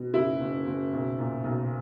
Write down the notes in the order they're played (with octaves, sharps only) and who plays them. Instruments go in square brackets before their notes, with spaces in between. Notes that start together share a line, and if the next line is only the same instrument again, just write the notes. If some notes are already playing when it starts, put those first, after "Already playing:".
Already playing: [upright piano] B2
F#1 E4
F#1
F#1
B1
A#2
B1